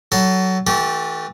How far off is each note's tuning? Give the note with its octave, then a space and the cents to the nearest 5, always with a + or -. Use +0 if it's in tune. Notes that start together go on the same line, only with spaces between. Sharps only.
F#3 +20 A4 +0 C6 +0
E3 -35 A3 +0 G4 -35